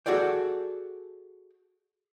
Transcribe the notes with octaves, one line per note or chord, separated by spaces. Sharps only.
F#4 G#4 A4 D5 G5